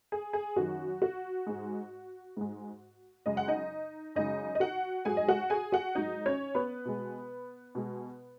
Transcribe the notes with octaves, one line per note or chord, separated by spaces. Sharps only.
G#4
G#4
F#2 D#3 F#3 F#4
F#4
G#2 G#3
G#2 G#3
F#2 C#3 G#3 D#5
F#5
D#4 D#5
F#2 C#3 G#3 D#4 D#5
D#5
F#4 F#5
G#2 F#3 G#4 G#5
D#5
F#4 F#5
G#4 G#5
F#4 F#5
G#2 F#3 D#4 D#5
C#4 C#5
B3 B4
B2 G#3
B2 G#3